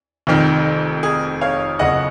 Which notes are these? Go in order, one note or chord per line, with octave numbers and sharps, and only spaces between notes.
F1 F2 D#3
G#4
C#5 F5
F#1 F2 C#3 D#5 F#5